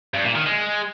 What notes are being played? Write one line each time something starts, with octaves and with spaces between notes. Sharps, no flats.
G2
A#2
D#3
G#3